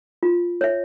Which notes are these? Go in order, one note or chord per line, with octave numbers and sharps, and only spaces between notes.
F4
C#5 E5